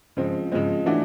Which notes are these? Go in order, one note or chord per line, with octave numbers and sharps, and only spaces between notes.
C#3 F3 G#3 C4
C#3 F3 G#3 C4
E3 A3 D4 F#4